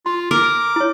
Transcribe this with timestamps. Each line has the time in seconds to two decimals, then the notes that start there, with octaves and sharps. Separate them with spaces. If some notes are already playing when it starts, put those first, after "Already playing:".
0.06 F4 C6
0.31 A#4 D6
0.76 E4 C#5